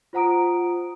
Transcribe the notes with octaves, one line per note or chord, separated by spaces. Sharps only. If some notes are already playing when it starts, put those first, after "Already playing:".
F4 C5 F#5 A#5 D#6 D7